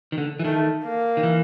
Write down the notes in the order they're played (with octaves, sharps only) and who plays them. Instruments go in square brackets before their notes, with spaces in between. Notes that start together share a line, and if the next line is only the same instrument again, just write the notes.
[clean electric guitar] D#3
D3
E3
[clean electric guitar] D#3 [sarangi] A3
[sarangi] A#3
[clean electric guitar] D#3
E3